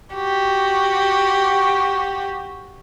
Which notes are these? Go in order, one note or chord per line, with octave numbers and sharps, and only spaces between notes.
F#4 G4